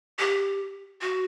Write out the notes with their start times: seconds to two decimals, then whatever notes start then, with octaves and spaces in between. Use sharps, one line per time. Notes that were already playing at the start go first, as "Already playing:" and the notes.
0.19 G4
1.01 F#4